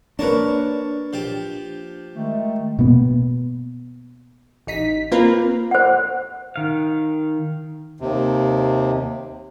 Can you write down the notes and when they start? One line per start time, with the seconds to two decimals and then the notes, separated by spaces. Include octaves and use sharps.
0.19 A#3 D4 A#4 B4 C#5 A5
1.13 F3 G4
2.15 D#3 G#3 A3
2.79 B2 A#3 B3
4.67 A1 D#4 B6
5.12 A#3 C4 F4 A#4 B4
5.71 C5 F#5
6.56 D#3 F5
8.00 D#2 C3